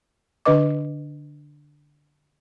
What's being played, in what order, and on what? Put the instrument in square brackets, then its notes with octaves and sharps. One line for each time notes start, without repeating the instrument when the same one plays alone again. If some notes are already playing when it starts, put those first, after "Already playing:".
[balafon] D3 D4 B4 D#5 D6